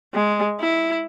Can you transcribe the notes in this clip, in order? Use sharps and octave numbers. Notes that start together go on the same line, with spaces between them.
G#3
E4